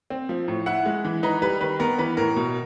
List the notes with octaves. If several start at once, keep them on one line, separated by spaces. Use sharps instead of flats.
C4
F3
A2
E4 F#5
G#3
E3
D#4 B4
G3 B4
D#3 B4
B3 A#4
E3 B4
A2 A#4
B2